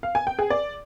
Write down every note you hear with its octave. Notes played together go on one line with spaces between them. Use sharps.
F5
G#5
G5
G#4
D5